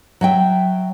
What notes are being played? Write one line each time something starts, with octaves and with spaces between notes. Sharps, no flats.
F#3 E5 G5